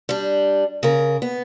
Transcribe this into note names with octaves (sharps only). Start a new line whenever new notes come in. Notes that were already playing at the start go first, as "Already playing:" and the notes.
G3 D4
C#3 A#4
B3